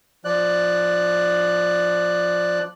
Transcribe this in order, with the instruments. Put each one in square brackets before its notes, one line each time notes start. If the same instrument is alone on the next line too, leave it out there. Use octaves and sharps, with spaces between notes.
[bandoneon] F3 D5 F#6